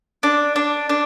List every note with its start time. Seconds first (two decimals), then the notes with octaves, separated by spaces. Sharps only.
0.23 D4
0.56 D4
0.89 D4